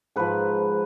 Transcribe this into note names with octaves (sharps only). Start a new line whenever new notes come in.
G#2 F3 B4